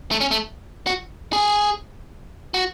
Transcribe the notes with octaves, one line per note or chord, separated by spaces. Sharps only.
A3
C#4
A3
F#4
G#4
F#4